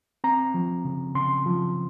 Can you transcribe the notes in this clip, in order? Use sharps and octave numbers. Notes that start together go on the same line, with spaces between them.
C4 A#5
F3
C#3
C#3 C6
F3